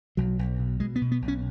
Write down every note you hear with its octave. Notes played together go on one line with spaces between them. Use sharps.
B1 F#3
B1
B2
B2 G#3
B3
B2
B3
B1
C#4